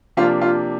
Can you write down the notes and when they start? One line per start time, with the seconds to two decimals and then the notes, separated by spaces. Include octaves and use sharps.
0.17 C3 F3 A#3 D4 F4
0.41 F4